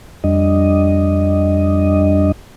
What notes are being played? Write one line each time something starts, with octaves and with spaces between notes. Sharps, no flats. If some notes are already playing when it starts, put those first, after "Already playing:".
F2 G3 D4 D#5